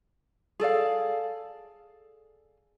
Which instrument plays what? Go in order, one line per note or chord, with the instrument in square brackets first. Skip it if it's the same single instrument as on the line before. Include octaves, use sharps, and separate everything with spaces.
[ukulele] G#4 A4 D5 F5